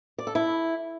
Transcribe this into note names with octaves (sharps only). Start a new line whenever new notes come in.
D5
A4
E4